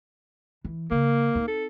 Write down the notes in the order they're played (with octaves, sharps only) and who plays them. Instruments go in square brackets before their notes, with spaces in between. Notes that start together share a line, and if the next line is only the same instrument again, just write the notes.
[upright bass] E3
[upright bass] C#3 [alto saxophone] A#3
[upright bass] C4 D#4
[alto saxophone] A4